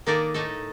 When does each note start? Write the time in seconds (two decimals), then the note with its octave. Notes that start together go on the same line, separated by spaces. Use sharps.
0.07 D#3 A#3 D#4 A4 D5
0.34 A2 A3 D#4 A4